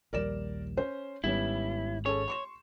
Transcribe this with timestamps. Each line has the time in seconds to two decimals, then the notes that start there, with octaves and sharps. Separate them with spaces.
0.13 A#1 D#2 G3 A#4 D5 E7
0.77 C#4 C5
1.24 G#1 G#2 G3 B3 C#4 E4
2.06 C#4 G#4 A4 C#5
2.28 C6 C#6 E7